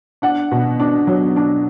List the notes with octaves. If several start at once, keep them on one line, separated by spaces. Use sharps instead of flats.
D4 F#5
B2
D4
F#3
D4